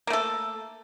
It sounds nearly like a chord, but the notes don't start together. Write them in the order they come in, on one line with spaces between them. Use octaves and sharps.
A#3 A3 A4